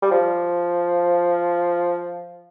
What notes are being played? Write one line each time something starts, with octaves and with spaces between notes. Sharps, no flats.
G3
F3